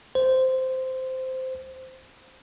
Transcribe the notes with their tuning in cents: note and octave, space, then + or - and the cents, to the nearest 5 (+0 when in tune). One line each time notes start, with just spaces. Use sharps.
C5 -10